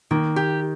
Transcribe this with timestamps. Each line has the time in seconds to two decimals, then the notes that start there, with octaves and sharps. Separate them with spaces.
0.11 D#3 A#3
0.36 G4